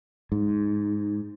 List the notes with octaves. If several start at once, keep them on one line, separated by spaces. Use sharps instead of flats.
G#2